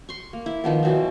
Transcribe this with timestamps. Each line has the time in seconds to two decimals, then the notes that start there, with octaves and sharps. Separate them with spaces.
0.09 C6 C#6
0.33 A#3
0.46 E4
0.64 D#3 F3 B3
0.83 B2 E3 F#3 C4